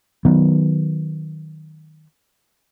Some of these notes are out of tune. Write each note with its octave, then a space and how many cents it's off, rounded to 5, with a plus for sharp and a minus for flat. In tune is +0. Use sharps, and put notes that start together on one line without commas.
D#3 +0 F#3 +0 B3 +10